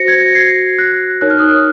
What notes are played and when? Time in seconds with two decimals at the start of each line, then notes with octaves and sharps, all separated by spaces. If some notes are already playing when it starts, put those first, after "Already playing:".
Already playing: F#4 C5 A#6 C#7
0.08 G#6
0.21 A#6
0.35 G#6 C7
0.78 F#6 A#6
1.21 D#4 A#4 C#5 F#6
1.30 F6
1.38 D#6 F#6